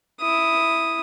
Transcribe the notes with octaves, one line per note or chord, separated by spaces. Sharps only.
E4 D#6